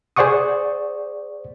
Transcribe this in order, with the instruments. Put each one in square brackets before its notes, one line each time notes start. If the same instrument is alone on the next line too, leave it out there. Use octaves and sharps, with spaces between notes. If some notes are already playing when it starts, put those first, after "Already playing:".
[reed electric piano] G#4 C5 D5 F#5 C#6 D#6